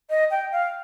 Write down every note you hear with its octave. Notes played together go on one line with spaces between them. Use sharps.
D#5
G5
F5